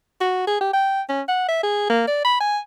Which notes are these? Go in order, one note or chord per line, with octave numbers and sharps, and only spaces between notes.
F#4
G#4
G4
G5
C#4
F#5
E5
G#4
A#3
D5
B5
G#5